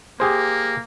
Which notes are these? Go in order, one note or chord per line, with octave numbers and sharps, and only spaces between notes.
A#3 G4 G#4 C5